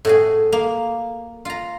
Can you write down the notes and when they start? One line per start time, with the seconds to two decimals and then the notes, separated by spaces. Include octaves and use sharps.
0.05 A2 F#4 G#4
0.52 A#3
1.45 F4 A#5